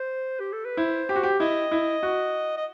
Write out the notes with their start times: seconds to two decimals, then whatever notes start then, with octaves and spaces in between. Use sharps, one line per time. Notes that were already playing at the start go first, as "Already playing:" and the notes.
Already playing: C5
0.40 G4
0.52 A4
0.65 B4
0.77 E4 C5
1.09 G4
1.16 F#4
1.23 G4
1.40 E4 D#5
1.72 E4
2.03 F#4
2.57 D#5